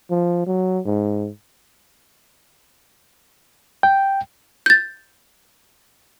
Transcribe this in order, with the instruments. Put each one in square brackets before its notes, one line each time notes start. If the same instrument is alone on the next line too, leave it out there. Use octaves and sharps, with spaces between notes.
[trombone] F3
F#3
G#2
[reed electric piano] G5
[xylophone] G6 A6